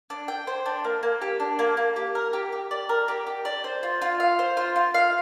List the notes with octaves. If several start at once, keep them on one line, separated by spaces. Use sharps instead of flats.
D4
G5
C5
D4
A#3
A#3
G4
D4
A#3
A#3
G4
A#4
G4
G4
D5
A#4
G4
G4
D5
C5
F4
F4
F5
C5
F4
F4
F5